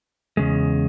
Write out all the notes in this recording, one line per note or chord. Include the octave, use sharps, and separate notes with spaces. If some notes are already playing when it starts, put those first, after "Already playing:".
E2 C#3 G#3